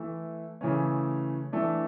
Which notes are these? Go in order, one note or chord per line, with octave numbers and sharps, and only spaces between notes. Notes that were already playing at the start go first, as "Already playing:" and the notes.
Already playing: E3 A3 E4
C#3 E3 A3 C#4
E3 A3 D4 A4